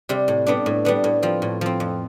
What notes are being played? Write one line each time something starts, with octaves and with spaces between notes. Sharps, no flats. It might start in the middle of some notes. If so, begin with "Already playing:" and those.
C3 G3
A2
G3 B3 D4
A2
G3 B3 D4
A2
F3 C4
A2
F3 C4
F2